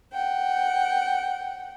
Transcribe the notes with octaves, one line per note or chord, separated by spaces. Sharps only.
F#5 G5